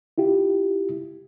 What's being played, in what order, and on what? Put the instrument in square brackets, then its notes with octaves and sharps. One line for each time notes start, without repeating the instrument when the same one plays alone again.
[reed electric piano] E4 F4 G4